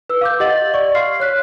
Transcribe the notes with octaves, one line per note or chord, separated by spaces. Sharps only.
B4 E6
F5 D6 G6
G4 D#5 F#5 A6 F#7
D5 C#6
F5 C6 F6 C7
C#5 F#6 B6